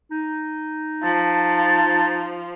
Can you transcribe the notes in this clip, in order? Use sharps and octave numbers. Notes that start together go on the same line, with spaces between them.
D#4
F3 A5